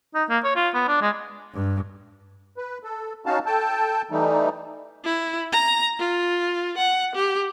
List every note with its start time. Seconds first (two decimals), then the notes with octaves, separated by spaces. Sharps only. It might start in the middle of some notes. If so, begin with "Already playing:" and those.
0.14 D#4
0.29 A#3
0.44 C#5
0.55 F4
0.74 B3
0.88 D4
1.01 G#3
1.54 G2
2.57 B4
2.84 A4
3.26 C#4 D#4 F#4 F5 A5
3.46 A4 G5 A5
4.11 E3 G3 A3 D#4
5.05 E4
5.52 A#5
5.99 F4
6.78 F#5
7.15 G4